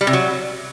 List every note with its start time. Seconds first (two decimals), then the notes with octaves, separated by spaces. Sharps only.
0.01 G3
0.07 C3
0.13 F#3